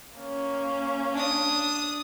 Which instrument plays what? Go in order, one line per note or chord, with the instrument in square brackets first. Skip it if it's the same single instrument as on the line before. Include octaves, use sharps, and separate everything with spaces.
[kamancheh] A#3 C#4
[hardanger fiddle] D4 D#6